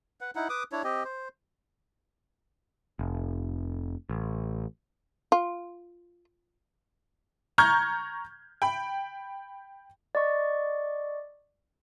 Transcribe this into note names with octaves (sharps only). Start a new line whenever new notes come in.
B4 F#5
D#4 E4 F#5
B4 D6 D#6
D4 E4 C#5
C4 G4 D#5
C5
F1
A1
F4
A#5 C#6 F6 G6 G#6
G5 B5
D5 D#5 C#6